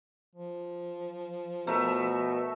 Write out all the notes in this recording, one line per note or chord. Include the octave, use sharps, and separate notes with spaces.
F3
B2 A3 A#4 E5